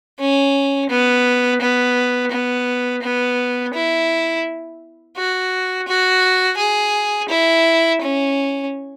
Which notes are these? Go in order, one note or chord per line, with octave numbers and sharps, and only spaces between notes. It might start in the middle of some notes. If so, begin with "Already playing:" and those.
C#4
B3
B3
B3
B3
E4
F#4
F#4
G#4
E4
C#4